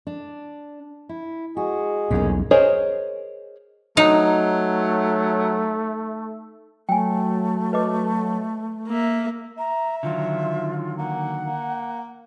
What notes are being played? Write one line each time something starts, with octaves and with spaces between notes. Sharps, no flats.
D4
E4
G#3 F#4 G#4
B1 E2 G2 A#3 C#4
G#4 A#4 C5 C#5 D#5
F#3 A3 D#4
F#3 A3 G5 G#5
B4 D#5 D6
A#3 E5
E5 A#5
D3 D#3 F#3 F4
A#3 F#5
A#3